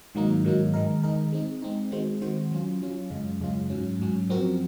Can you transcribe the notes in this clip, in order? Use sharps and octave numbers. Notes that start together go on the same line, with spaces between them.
G#2 D#3 F#3 A#3 D#4
G#2 D#3 F#3 A#3 D#4
D#3 G#3 D#4 A#4
D#3 G#3 D#4 A#4
G#3 C4 D#4
G#3 C4 D#4
D#3 G#3 C4 F#4 C5
D#3 G#3 C4 F#4 C5
F#3 C#4 F4
F#3 C#4 F4
F#2 C#3 G#3 C#4 F4
F#2 C#3 G#3 C#4 F4
G#2 F#3 C#4
G#2 F#3 C#4
F#2 F3 C4 F#4 A#4